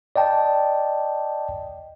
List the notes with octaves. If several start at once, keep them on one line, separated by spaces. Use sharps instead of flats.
D5 D#5 G5 A5